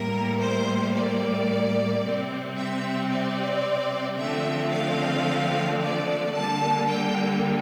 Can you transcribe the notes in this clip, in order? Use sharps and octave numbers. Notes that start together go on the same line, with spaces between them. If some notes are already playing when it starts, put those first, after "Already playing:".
Already playing: A2 G3 A#3 A#4
C5
D5
C3 G3 C4
E5
D5
D3 F3 A3 C4 E5
F5
D5
D3 G3 A#3 A5
G5